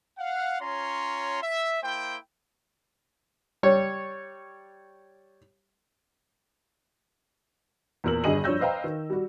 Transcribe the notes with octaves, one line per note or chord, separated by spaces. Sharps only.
F5 F#5
C#4 F4 C#5 A#5 C6
E5
A#3 E4 C5 G5
G3 C#5
E2 A#2 A#4 E6 F#7
G1 G2 G#4 D#5 D#7 F#7
G2 F3 C#5 E6 G6 A#6
B4 C5 D#5 F5 G5 A#5
D#3
G3 F#4